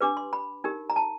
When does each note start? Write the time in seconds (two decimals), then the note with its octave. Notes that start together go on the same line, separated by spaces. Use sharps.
0.01 D4 G4 B4 D6
0.17 C6
0.33 B5
0.64 D#4 G4 A#4
0.90 A#5
0.96 A5